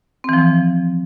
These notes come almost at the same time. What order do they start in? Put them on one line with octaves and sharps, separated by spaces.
C4 E3 F3